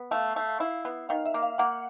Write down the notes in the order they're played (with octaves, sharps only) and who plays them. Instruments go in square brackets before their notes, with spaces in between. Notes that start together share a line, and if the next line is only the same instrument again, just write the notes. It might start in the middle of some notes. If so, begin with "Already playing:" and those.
Already playing: [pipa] B3
[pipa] A3 [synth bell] F5
[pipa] A3
E4
B3
[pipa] D#3 [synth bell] F5
[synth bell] E5
[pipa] A#3
[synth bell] F5
[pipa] A#3 [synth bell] F#5